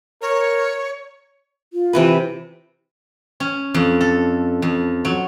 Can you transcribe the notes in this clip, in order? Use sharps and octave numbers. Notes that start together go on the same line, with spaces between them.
A#4 C#5
F4
C3 E3 B4
C#4
F2
A4
F2
F#3